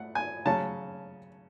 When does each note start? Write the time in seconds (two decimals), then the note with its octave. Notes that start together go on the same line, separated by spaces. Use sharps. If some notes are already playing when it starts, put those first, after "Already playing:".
Already playing: A3 F#5
0.15 G#5
0.45 C#3 F#3 C#4 A5